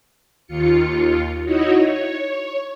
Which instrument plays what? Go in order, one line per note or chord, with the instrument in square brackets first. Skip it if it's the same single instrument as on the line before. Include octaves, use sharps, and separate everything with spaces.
[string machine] D#2 F4 C#7
D#4 E4 F#4 C#5 D#5
C#5